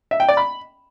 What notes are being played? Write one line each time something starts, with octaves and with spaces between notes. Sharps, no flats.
E5
G5
D5
B5